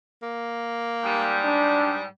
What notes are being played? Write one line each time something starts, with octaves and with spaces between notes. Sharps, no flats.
A#3
G#2 G3
D4